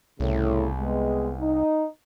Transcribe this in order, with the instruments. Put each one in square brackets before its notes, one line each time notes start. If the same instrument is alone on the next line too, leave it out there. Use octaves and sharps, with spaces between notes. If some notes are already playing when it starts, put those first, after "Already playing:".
[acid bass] C2 [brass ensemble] A2 C#3
[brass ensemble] G#3 B3
D#4